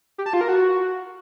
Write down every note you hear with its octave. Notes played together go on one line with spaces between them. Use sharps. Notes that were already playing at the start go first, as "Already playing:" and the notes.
G4
A5
F4
A#4
F#4